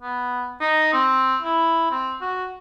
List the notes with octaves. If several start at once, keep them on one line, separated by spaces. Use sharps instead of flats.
B3
D#4
C4
E4
C4
F#4